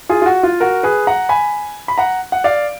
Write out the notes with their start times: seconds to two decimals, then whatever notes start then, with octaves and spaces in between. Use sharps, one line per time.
0.09 F4 G#4
0.22 F4
0.26 F#4
0.43 F4
0.60 F#4 A#4
0.83 G#4 B4
1.07 F#5 A#5
1.29 G#5 B5
1.88 B5
1.98 F#5 A#5
2.32 F#5
2.44 D5 F5